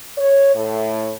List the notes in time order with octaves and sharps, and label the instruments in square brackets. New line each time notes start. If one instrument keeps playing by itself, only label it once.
[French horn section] C#5
A2